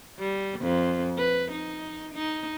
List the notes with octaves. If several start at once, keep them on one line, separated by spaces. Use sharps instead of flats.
G3
F2
B4
D#4
D#4